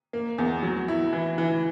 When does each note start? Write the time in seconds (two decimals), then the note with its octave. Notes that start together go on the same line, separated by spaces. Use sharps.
0.13 A#3
0.38 E2
0.63 F#3
0.88 E4
1.13 E3
1.38 E3